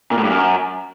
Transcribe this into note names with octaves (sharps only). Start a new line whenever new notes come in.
A#2
A2
G2
F#2